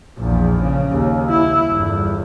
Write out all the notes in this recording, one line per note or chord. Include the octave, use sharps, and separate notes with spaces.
A#1 E2
C#3
D#2
E4
G1 E2